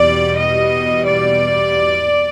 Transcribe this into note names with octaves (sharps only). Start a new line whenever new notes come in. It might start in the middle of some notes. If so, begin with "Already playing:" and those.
Already playing: E2 B2 G3 D5
D#5
D5